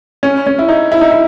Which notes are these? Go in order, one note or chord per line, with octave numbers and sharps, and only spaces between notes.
C#4
C#4
E4
D#4
E4
D#4
E4